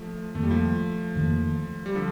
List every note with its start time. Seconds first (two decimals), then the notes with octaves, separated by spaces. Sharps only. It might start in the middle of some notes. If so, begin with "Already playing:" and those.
Already playing: F3 A3
0.35 F2 D#3 A3 A#3
0.43 G3
0.51 F3 A3
1.15 F2 D#3 A#3
1.86 G3
1.95 D3 F3